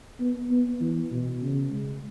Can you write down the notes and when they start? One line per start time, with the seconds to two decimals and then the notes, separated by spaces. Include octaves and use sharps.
0.20 B3
0.51 B3
0.81 E3
1.11 B2
1.42 C#3
1.71 G#3